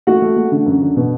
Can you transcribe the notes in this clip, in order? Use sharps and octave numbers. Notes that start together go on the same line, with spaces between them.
A3 F#4 F#5
A3
A3
D3
F#2
D3
B2